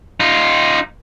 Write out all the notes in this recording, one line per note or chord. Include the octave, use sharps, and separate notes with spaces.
D#4 F4